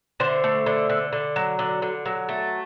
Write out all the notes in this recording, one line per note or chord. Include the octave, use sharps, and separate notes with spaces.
D3 C5 E5
A3
D3
D3
D3
F#3
D3
D3
F#3
A3